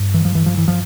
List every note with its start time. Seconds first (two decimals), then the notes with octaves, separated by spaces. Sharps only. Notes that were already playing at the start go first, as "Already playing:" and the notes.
Already playing: G2
0.14 E3
0.25 F3
0.35 E3
0.46 F3
0.57 E3
0.68 F3